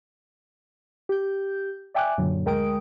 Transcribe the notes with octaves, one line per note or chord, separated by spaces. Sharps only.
G4 G6
D5 E5 G5 G#5 D6 F#6
F#2 A#2 D3 F#3
D2 G#3 A#4 G5 D#6 D7